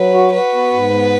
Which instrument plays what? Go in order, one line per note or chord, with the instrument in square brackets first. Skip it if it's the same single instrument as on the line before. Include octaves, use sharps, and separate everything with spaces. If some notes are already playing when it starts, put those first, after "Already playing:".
Already playing: [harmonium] F#3 [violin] B4
[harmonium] F#4
[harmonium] F#4 [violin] B4
[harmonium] B3
G#2
B3